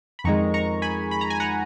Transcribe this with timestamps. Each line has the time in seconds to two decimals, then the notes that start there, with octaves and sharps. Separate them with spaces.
0.19 B5
0.24 F2 D#3 G#3 A#5 C#6
0.54 A#5 C#6
0.82 G#5 B5
1.11 B5
1.21 A#5
1.30 G#5
1.40 F#5 A#5